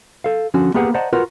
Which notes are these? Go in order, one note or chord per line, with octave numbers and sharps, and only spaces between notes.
A4 F5
D3 F3 C#4 F#4
A#3 B3 G4 G#4 B4 F#5
C5 D5 D#5 F#5 A5 A#5
F4 F#4 A#4 B4 F#5